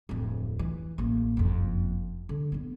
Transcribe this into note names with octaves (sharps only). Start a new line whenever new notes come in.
D1 F2
E3
A1 A#3
F#1 F2
D3
G2 B3